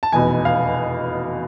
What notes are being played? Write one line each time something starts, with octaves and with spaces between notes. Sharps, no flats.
A5
F1 E2 B2 G#5
F5